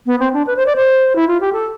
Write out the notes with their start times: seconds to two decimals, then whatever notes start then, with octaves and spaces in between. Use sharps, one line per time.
0.06 B3
0.20 C4
0.33 D4
0.47 B4
0.57 C5
0.66 D5
0.76 C5
1.16 E4
1.28 F4
1.40 G4
1.53 A4